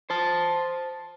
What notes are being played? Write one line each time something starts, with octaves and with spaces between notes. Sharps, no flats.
C5 A5